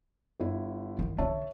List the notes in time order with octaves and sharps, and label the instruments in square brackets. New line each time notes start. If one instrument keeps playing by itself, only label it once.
[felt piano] G1 E4
[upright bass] D#3
[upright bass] D3 D4 [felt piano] C#5 E5 A5